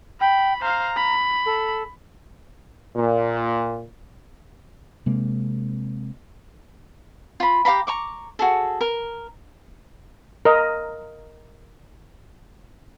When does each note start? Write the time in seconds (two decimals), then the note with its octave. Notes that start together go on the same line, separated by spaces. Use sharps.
0.21 G5 B5
0.61 C5 F5 A#5
0.97 B5
1.45 A4
2.96 A#2
5.06 C3 G#3 A#3 C4
7.40 F4 B5
7.65 G4 F5 A#5 B5
7.87 A#5 C#6 D6
8.39 F#4 G#4 A4
8.81 A#4
10.45 A#4 D#5